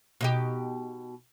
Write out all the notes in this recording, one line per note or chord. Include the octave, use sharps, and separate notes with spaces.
B2 D#4 G4